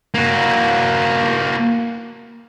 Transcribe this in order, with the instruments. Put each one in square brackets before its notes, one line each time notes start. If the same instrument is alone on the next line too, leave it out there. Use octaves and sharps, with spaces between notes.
[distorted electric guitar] A#3 F#4